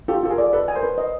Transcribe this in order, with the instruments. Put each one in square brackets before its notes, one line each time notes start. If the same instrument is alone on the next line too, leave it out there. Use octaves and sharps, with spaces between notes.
[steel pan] F4 [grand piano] G4 A4
[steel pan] F4 [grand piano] A4
[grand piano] G#4 A#4
[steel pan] D5
[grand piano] A4 B4 [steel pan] D#5
[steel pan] G#5
[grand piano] A#4 C5
[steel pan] B4
D#5